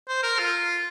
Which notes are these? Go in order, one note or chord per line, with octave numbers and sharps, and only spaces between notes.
C5
A#4
F4